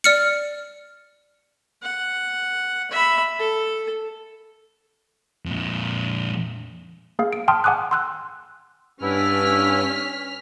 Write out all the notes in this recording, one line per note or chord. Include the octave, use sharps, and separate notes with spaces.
D5 F6 C#7
F#5
E5 B5
A4
F2 A#2
A#3 G#4 F5
D7
G5 A5 C6 D#6 F6
F#5 G#5 D6 D#6 F#6
C6 E6 F#6
G2 B3 C#4 D4 E4 F6 B6